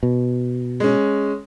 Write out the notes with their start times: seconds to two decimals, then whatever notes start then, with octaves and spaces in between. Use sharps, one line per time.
0.03 B2
0.80 G#3 C#4